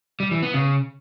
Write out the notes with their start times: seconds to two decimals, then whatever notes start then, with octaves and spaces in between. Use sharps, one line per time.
0.20 G3
0.31 E3
0.43 B3
0.54 C#3